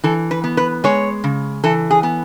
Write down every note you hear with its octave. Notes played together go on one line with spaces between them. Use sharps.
E3 A4
B4
B3
B4
G#3 C#5
C#3
E3 A4
G#4
B3